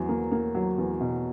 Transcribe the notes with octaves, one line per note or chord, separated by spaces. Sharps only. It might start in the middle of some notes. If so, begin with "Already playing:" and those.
Already playing: E2 F#3
A#3
A#3
F#3
E2
B2